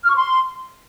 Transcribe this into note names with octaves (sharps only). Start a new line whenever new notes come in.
F6
C#6
C6